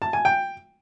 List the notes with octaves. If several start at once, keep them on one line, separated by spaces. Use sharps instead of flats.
A5
G#5
G5